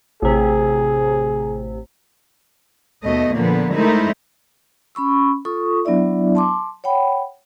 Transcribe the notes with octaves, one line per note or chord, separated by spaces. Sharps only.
A1 C3 G#4
D#2 B2 A3 D#5
A#2 D3 F3 A#3 B3
G#3 A3 D#4 E4 A#4 C5
C#4 B5 C#6 E6
F4 A4 C#6 D#6
F#3 B3 D4 E4 D5 E5
A5 C6 D6
C#5 F#5 G5 B5